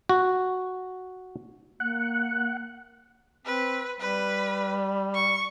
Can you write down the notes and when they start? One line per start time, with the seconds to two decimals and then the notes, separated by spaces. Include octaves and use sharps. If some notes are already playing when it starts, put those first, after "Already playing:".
0.09 F#4
1.80 A#3 F#5
3.46 C4 B4
4.00 G3 B4
5.15 C#6